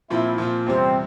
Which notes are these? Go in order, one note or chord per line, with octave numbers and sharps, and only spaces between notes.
A#2 F3 C4 E4 F4
A#2 F3 C4 F4
E2 C3 G3 C4